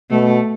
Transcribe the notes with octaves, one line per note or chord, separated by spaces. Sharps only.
B2 A3